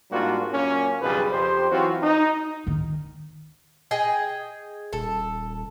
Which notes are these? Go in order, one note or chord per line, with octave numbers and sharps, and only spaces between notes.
G#2 G3 A#3 D4 F4 F#4
F#2 A#2 A#3 C#4
B1 F2 C#3 G3 G#4 B4
F2 G4 C5
E3 F#3 C4 F4 F#4
D#4
D#3
G#4 D#5 G5
D#1 A4